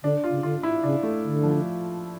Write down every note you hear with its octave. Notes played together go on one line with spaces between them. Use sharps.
D3 D4
F4
C#3
D3 F4
E4
C#3 D4
A3
D3
F3